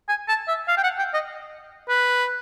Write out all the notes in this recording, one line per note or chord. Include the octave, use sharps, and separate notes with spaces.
G#5
A5
E5
F5
G5
F#5
G5
D#5
B4